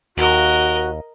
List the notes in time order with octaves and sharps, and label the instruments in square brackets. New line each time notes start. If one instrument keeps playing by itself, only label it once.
[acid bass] D#2 [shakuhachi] F#4 [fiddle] A#4 D#5